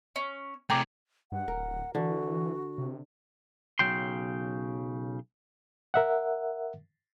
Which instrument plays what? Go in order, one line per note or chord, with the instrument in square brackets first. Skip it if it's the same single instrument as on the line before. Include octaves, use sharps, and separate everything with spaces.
[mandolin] C#4
[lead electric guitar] C3 A3 [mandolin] G#4 [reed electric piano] G5 A#5 D6
[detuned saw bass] G2 [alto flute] F#5
[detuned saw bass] D1 [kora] A#4
[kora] D3 [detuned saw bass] E3 [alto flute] F#4
[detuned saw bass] C3
[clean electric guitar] B1 C#3 F#3 G5 C6
[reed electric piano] A#4 E5 F#5